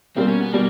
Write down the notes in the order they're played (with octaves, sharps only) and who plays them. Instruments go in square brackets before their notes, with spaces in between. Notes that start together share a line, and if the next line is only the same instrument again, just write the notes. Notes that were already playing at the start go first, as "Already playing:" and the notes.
[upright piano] B2 G3 A#3 [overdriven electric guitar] C4
[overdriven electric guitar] C#4
B3
[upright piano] B2 G3 [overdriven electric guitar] A#3